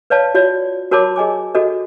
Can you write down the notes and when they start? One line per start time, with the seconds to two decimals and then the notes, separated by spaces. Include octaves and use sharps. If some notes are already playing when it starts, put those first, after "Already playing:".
0.10 B4 C#5 D5 F5 A5
0.34 F4 F#4 C#5 D5
0.91 F#4 A#4 C#5 A5 B5 D6
1.16 G#4 D#5 G#5 D6
1.55 F#4 A4 D#5